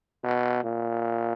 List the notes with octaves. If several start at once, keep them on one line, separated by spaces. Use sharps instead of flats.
B2
A#2